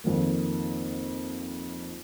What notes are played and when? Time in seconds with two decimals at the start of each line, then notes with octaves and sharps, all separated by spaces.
0.04 F2 D#3 A#3